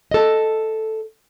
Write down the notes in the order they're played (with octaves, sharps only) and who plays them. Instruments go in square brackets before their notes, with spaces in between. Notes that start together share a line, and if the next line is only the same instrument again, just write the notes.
[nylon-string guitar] A4 D#5